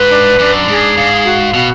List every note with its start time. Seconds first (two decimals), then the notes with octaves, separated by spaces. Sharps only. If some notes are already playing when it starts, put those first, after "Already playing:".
Already playing: G#2 B4
0.10 D4
0.39 F#2 D4
0.68 G#2 G#4
0.97 G#2 F5
1.25 F#4
1.54 B2 F#4